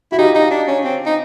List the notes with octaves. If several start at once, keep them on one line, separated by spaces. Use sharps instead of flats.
E4 F#4
D#4 F4 G4
D#4
D4
C#4
C4
D#4